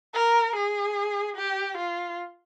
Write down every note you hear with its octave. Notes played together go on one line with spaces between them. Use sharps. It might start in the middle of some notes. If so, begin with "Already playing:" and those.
A#4
G#4
G4
F4